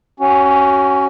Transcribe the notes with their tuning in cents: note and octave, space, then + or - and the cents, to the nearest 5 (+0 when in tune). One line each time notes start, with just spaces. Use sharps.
C#4 +0 F#4 +25